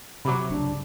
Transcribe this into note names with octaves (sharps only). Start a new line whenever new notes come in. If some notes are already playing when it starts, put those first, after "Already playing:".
C3 F#3 B5 D6
C#2 G2 D4